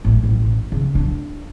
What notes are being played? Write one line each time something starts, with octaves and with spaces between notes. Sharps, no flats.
A1
A1
C#3
D4